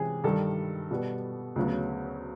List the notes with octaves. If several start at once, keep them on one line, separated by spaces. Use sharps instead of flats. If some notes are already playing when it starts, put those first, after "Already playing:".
Already playing: C3 E3 G#3 C#4 G#4
G2 D#3 G3 A4
B2 G3 B3
D2 C#3 F#3 B3